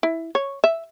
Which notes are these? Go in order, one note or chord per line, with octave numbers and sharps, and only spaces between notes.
E4
C#5
E5